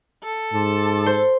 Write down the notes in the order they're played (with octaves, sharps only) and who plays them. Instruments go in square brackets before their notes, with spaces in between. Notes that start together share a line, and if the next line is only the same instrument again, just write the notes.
[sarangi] A4
[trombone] G#2 [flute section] A5 C6 D6
[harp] C5